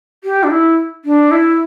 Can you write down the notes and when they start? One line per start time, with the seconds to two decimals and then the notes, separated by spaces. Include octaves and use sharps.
0.24 G4
0.43 D4
0.51 E4
1.05 D4
1.31 E4